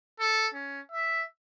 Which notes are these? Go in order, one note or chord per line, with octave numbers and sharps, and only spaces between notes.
A4
C#4
E5